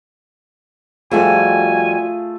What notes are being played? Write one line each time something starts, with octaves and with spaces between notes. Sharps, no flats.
F2 G3 A3 F4 F#4 G#4 G#5